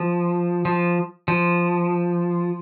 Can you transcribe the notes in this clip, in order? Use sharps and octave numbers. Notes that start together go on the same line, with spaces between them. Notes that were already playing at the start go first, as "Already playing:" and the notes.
Already playing: F3
F3
F3